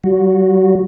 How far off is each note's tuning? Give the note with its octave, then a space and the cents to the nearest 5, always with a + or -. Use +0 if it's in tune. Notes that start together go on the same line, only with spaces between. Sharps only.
F#3 +45 F#4 -15